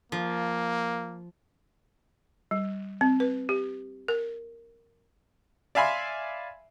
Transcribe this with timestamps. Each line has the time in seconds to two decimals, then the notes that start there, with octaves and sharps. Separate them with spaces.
0.12 F3 A#3
2.51 G3
3.01 C4
3.20 B4
3.49 G4
4.08 A#4
5.75 D5 E5 F5 G#5 B5 C6